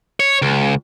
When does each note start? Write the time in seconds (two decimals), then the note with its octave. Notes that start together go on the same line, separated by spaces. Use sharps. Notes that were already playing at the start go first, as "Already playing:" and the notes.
0.20 C#5
0.42 C#2